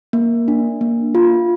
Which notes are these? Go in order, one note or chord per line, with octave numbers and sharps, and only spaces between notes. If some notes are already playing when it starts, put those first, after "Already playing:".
A#3
D4
A#3
F4